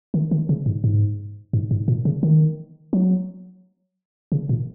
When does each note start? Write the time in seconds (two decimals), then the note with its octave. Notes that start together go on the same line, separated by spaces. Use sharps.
0.14 D#3
0.31 D#3
0.49 C#3
0.66 G#2
0.84 G#2
1.53 G#2
1.71 G#2
1.88 A#2
2.05 C#3
2.23 D#3
2.93 F#3
4.32 C#3
4.49 A#2